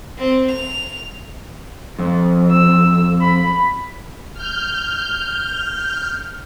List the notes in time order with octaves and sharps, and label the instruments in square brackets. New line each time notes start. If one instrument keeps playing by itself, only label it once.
[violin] C4
F7
[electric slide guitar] F2
[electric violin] E6
B5
[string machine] F6 G6